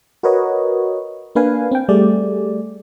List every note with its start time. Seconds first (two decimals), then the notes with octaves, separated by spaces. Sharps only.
0.23 F#4 A#4 B4 C#5 D#5
1.35 A#3 D4 B4 F5 G#5
1.71 C4 G5
1.89 G3 A3 G#4 D5